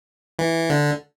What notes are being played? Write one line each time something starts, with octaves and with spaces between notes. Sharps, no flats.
E3
D3